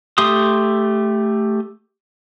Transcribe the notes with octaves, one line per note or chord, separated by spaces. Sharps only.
A3 G4 C6 D#6